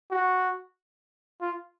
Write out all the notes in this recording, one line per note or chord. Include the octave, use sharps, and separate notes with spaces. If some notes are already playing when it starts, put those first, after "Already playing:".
F#4
F4